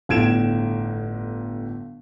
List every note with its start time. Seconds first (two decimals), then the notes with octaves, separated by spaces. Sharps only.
0.09 G1 A2 G#6 D7 E7